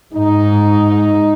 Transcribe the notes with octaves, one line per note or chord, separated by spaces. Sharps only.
G#2 D#4